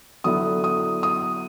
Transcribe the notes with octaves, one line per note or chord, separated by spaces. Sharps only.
D3 F#3 B3 E4 D#6
D#6
D#6